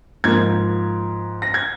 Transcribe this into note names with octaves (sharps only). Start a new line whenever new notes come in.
G#2 F3 A#3 G#6
A#6
G#6